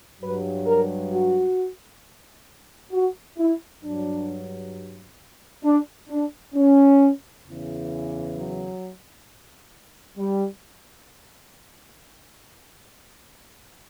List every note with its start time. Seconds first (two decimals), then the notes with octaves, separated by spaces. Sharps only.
0.21 G2 F#3 B4
0.66 A#4
1.12 F#4
2.92 F#4
3.39 E4
3.83 G2 F#3 D4
5.64 D4
6.09 D4
6.55 C#4
7.45 E2 C#3 E3
8.36 F#3
10.17 G3